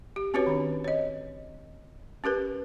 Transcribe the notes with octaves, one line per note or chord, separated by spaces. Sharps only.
G4
C4 C#4 F#4 G4 B4 C#5
D#3 D4
C#5 D#5
C#4 G4 A#4 B4